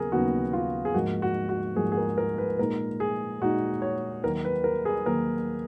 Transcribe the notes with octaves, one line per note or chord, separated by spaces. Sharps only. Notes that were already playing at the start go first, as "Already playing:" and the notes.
Already playing: D#2 C#3 F#3 B3 G#4 A#4
D#2 C#3 F#3 B3 D#4 F#4
F4
G#4
G#2 F3 A#3 F#4
F#4
F#4
G#2 F3 A#3 G#4
G#4
A#4
A#4
B4
A#2 G#3 D#4 A#4
G#4
A#2 G#3 D#4 F#4
C#5
D#2 D#3 F#3 A#3 A#4
B4
A#4
G#4
D#2 D#3 F#3 A#3 A#4